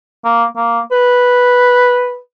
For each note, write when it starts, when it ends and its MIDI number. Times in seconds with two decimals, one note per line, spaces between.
0.25 0.44 58
0.56 0.80 58
0.92 2.18 71